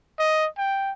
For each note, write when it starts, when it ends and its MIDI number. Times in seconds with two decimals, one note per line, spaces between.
0.19 0.47 75
0.58 0.92 79